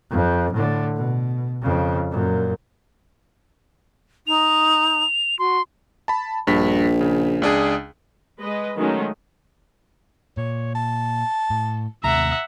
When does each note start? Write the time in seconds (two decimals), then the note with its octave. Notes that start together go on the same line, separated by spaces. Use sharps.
0.11 F2
0.53 A2 D3
0.96 B2
1.62 F2 C#3
2.11 F#2 A#2
4.27 D#4 F7
5.39 F#4 C6
6.08 A5 B5
6.47 A#1 G2 B6
7.01 C#3
7.42 C#2 D4 G#4
8.41 G#3 B4 D#5
8.76 D#3 F#3 G#3 A3 C#4 D#4
10.37 A#2 C#5
10.75 A5
11.50 A2
12.04 D#2 C3 A3 E5 F#5 A#5